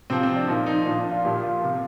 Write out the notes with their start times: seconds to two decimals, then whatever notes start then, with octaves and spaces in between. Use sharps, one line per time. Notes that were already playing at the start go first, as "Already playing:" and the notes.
0.10 C3 F3 C4
0.23 C4
0.36 D4
0.48 A#2 F3 D#4
0.66 D#4
0.86 A#2 F3 D4
0.99 D4
1.11 F4
1.25 A#2 F3 G4
1.43 F4
1.62 C3 F3